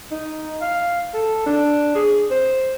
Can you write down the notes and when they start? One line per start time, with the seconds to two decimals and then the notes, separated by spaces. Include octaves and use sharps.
0.11 D#4
0.62 F5
1.14 A4
1.46 D4
1.95 G#4
2.31 C5